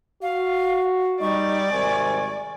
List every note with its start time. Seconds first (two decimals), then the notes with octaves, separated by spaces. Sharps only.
0.22 F#4 F5
1.21 G3 D#4 D5 C#6
1.71 G#1 C3 A#4 G#5